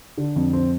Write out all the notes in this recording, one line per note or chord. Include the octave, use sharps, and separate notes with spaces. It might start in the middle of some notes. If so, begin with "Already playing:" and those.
D3
F2
C4